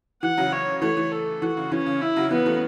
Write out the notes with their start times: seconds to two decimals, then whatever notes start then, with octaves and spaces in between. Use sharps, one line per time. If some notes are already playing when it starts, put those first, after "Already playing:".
0.22 E3 F#5
0.37 C#3 F#3
0.52 C#5
0.82 E3 A3 C#5
0.97 E3
1.12 A4
1.42 E3 F#4
1.57 C#3
1.71 E3 C#4
1.86 C#3
2.01 E4
2.16 C#3 F#3
2.31 E3 B3
2.46 E3 A3